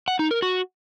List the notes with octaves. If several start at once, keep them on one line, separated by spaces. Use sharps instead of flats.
F#5
D#4
A#4
F#4